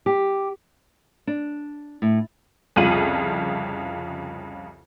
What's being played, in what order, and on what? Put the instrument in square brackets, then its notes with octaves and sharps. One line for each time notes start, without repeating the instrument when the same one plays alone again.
[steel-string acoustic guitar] G4
[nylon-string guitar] D4
A2
[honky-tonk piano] C2 F2 C#3 F4 D#7 F#7